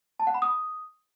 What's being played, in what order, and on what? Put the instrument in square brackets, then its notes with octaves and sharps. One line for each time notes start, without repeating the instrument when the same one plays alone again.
[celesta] A5
F#5
B5
D#6